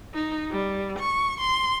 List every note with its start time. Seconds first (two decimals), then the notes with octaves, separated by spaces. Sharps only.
0.14 D#4
0.51 G3
0.99 C#6
1.41 C6